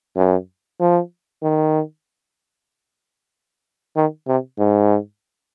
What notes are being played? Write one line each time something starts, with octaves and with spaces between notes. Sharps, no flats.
F#2
F3
D#3
D#3
C3
G#2